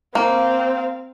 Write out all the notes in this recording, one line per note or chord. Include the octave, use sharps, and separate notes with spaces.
A#3 C4 F5